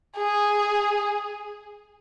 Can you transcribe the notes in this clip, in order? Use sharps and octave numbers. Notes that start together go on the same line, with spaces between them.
G#4